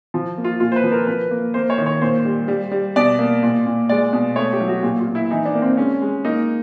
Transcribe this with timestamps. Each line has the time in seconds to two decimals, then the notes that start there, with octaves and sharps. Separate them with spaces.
0.14 F3
0.37 A#3
0.44 F4
0.60 A#2 F4
0.72 C5
0.76 B4
0.84 F3
0.92 A#4
1.07 F3 B4
1.31 A#3
1.54 A#3 C5
1.70 C#5
1.78 D#3
1.86 C#5
2.01 A#2 C5
2.25 G3
2.48 G3
2.71 G3
2.96 B2 D5
3.19 A#3
3.43 A#2
3.66 A#2
3.89 G#3 D5
4.13 B2
4.36 A3 C#5
4.53 G4
4.61 F#3
4.68 F#4
4.83 A#2 G4
5.00 F4
5.07 A#2
5.15 E4
5.31 E3 D#4
5.45 D4
5.54 A#3
5.62 C4
5.77 G#3 C#4
6.01 G#3
6.25 A#3 D#4